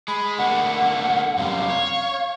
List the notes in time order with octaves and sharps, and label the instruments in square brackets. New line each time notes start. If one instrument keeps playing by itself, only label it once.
[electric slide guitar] G#3 [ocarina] B5
[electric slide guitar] D3 A3 A#3 [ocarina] F#5
[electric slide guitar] F#2 C3 G3 [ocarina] F5
[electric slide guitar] C#5